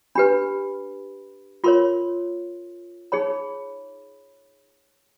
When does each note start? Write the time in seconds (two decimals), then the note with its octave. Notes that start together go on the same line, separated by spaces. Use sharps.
0.15 D4 G4 B4 B5
1.64 F4 A#4 C#5 C6
3.12 D#4 G#4 C#5 B5